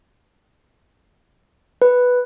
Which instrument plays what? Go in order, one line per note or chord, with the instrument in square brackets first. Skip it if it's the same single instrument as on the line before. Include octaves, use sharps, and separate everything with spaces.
[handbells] B4